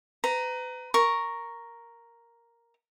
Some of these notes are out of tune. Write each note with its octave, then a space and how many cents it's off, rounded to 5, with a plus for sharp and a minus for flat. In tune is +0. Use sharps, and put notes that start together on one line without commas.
B4 +35 A#5 +0
A#4 +0 C#6 +0